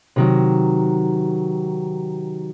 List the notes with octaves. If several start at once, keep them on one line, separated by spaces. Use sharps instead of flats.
C3 D#3 F#3